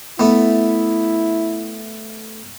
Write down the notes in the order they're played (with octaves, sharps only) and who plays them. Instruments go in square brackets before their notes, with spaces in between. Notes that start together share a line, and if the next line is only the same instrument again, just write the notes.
[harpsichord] A3 B3 [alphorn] E4